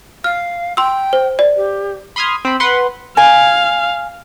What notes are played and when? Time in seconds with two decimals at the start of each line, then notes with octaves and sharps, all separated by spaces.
0.24 F5 F6
0.77 G5 C6 E6
1.13 C5
1.39 D5
1.56 G4
2.16 B5 C6 D#6 F6 G#6
2.45 C4 B5
2.60 B4 F#5 C6
3.17 F5 G#5